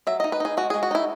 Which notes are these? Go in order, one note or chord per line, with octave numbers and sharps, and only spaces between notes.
F#3 E5
D#5
D#4
B4
D#4 G#4
G#3 F#4
G#3 G#4
F#4
D#4 E4